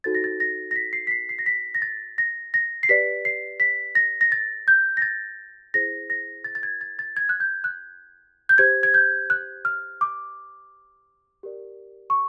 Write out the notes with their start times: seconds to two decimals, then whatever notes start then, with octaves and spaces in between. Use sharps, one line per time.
0.04 D#4 F#4 A4 C5 A6
0.15 A#6
0.24 A6
0.40 A#6
0.71 A#6
0.76 B6
0.93 C7
1.07 B6
1.11 C7
1.29 C7
1.39 A#6
1.46 B6
1.75 A#6
1.82 A6
2.18 A#6
2.54 A#6
2.83 C7
2.89 G4 B4 D5 B6
3.25 C7
3.60 B6
3.95 A#6
4.21 A#6
4.32 A6
4.68 G6
4.97 A#6
5.02 A6
5.74 E4 G#4 C5 A#6
6.10 A#6
6.44 A6
6.55 A6
6.63 G#6
6.81 A6
6.99 A6
7.17 G#6
7.29 F#6
7.40 G6
7.64 F#6
8.49 G6
8.58 G4 C5 G#6
8.83 G#6
8.94 G6
9.30 F#6
9.65 F6
10.01 D6
11.43 G4 A#4 D5
12.10 C#6